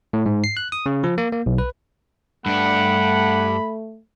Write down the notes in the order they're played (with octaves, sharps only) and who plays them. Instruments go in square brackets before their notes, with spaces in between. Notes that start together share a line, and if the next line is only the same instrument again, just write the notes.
[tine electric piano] A2
G#2
C7
F#6
D#6
C#3
F3
A#3
A#3
B1
B4
[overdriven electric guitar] G2 D4 [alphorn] A3 [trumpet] F#5 [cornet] B5